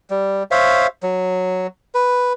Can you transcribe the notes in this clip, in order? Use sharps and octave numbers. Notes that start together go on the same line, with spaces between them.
G3
C5 C#5 E5 F5
F#3
B4